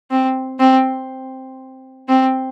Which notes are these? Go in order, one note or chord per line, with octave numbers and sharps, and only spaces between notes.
C4
C4
C4